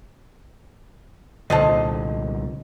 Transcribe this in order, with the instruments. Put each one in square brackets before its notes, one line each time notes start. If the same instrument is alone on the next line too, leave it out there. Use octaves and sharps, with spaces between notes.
[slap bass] C2 A#2 D3 [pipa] A4 C5 D#5